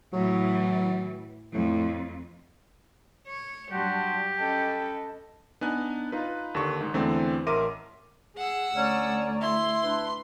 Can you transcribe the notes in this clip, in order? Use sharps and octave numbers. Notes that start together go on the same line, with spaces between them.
A2 E3 F#3
F2 A2
C#5
G2 F#3 G3 F#4 G4 A5 C6 F#6
C#4 A4 B4 D#5 G5 A5
B3 D4 D#4 G#5 F#6
D#4 F4 B4
D#2 D3 D4 C#6
G#2 G#3
E2 D3 E3 A3 C4
A1 A#4 E5 C6 D6 D#7
G#4 F#5 E6
D2 C#4 D5 A#5 C#6
E4 C6
D4 B4